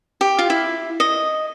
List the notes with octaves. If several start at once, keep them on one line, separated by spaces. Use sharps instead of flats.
G4
F4
E4
D#5